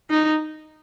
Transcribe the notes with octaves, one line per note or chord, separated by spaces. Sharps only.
D#4